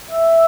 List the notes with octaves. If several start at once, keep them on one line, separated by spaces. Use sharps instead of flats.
E5